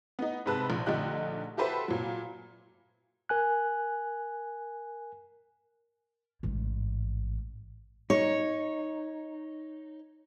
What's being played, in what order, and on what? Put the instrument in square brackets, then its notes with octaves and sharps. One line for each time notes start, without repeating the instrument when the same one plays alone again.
[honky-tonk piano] B3 D#4
G#2 C3 B4 A5 F#6
A#1
A#1 D3 A3 D#4 G4 F#6
F#4 G4 A4 B4 C5 E5
A#2 F#3
[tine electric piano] A#4 G#5 F#6
[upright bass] A1 G#2
[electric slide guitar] D#4 [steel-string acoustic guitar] C#5